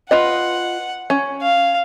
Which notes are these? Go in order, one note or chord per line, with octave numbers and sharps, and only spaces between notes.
F4 B4 D#5 F#5
C#4
F5